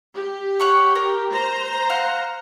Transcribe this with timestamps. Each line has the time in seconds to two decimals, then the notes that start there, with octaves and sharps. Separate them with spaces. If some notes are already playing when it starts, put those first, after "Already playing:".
0.14 G4
0.60 C#5 F#5 C#6
0.95 A#4
1.32 C5 A#5
1.90 F5 F#5